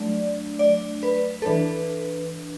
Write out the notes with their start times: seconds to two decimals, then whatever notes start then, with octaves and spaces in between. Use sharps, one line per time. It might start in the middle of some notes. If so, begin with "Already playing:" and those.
Already playing: F#3 A3 D4 D5
0.59 D5
1.03 B4
1.42 A4
1.46 E3 D4 B4